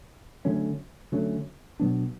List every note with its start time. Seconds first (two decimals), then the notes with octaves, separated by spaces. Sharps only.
0.45 D3 F#3 A3 C#4
1.12 D3 F#3 A3 C#4
1.80 B2 F#3 B3 D4